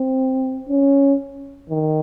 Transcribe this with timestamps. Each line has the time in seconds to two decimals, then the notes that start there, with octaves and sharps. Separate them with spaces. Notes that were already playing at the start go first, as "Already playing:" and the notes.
Already playing: C4
0.69 C#4
1.70 D#3